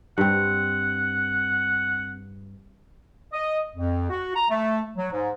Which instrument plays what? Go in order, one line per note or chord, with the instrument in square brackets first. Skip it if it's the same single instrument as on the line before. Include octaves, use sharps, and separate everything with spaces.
[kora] G2 C4 [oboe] F#5
[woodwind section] D#5
F2
F#4
A#5
A3
F#3
G#2